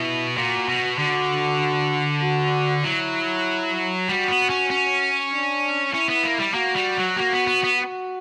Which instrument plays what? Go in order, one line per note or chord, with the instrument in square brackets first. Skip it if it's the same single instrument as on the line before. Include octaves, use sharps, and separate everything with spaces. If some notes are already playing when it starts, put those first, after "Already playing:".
Already playing: [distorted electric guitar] B2 [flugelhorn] E4
[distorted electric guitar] A#2 [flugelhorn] F#4
[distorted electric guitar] B2
[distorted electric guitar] D3 [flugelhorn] F#4
[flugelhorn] F#4
[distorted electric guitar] F#3 [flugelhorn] E4
[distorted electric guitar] G3 [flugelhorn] F#4
[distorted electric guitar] B3
C#4
C#4
[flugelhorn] D4
[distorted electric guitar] C#4 [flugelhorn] E4
[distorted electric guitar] B3
A#3
G3
[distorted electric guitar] A#3 [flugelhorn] F#4
[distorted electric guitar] G3
F#3
[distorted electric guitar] A#3 [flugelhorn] F#4
[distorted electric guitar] B3
B3
B3
[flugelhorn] F#4